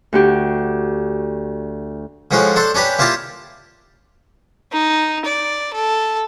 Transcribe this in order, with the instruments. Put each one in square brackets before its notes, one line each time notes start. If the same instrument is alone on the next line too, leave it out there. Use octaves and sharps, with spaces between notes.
[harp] D2 F#4 G4
[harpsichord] A2 F3 G#3 C#4 F#4
D4 A4 C5
C#4 D4 G4 B4
A#3 E4 F4 G4 A5
[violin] D#4
D5
A4